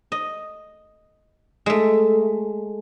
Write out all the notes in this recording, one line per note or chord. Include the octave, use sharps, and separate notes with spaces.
D#5
G#3 A3